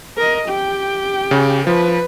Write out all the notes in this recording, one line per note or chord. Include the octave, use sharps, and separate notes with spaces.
A#4 D#5
G4 G5
C#3
F3 B4